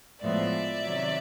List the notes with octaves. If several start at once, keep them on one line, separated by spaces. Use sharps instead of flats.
A2 F3 G#3 B3 D5 E5
C3 D#3 F#3